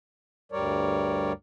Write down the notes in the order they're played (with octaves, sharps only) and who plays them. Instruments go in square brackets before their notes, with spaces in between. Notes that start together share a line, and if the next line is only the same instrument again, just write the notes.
[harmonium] D2 G2 G3 A#4 C#5 D5